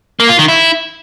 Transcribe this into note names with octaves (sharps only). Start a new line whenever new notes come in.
A#3
F4
D#3
E4